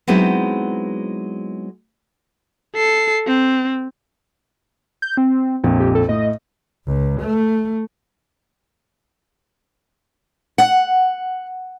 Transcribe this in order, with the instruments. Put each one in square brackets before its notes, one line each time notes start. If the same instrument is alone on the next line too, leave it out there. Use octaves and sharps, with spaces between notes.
[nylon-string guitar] F#3 G#3 B3 C4 D#4 E4
[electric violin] A4 C7
C4
[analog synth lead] G6
C4
[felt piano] A#1 F2
[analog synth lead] G4
A4
[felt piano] A2 [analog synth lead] D#5
[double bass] C#2
A3
[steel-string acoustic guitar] F#5